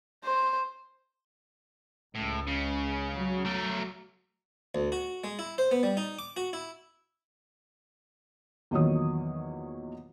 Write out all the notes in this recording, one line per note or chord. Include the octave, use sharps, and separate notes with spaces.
C5
C#2 A2
C#3
F#3
A3 A#4
D2
F#4
G#3
E4
C5
B3
G3
D#4
D6
F#4
E4
E2 A#2 D#3 F#3 C#5 D#6